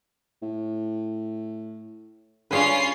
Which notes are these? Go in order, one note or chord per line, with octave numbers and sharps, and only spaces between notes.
A2
G2 C#4 D4 F4 G#4 B4 C7